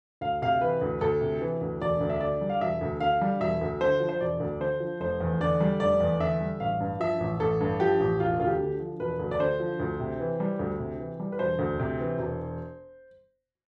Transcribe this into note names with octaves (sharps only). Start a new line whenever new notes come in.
D2 F5
C3 F5
E3 B4
D2
D2 A4
C3
E3
D2
E1 D5
D2
E5
D3 D5
G3
F5
E1 E5
D2
D3 F5
G3
E1 E5
D2
D3 C5
F3
C5
E1 D5
D2
D3 C5
F3
F1 C5
E2
D3 D5
G3
F1 D5
E2
D3 E5
G3
A1 F5
G2
F3 E5
A1
A1 A4
G2
F3 G4
A1
E1 F4
D2 F4
G4
D3
F3
E1 B4
D2
D5
D3 C5
F3
D2
C3
E3
G3
D2
C3
E3
G3
B4
E1 C5
D2
C3
E3
E1